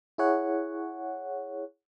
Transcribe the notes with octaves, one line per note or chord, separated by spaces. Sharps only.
E4 G#4 C#5 F#5